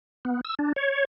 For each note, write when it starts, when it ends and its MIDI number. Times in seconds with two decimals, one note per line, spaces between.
0.25 0.41 59
0.45 0.55 88
0.59 0.72 62
0.76 1.05 73